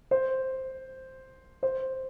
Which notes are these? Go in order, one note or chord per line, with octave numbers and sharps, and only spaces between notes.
C5
C5